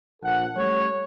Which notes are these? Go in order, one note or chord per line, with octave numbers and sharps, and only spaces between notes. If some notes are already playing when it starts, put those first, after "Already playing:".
A#1 A4 F#5
G3 A3 C#4 C#5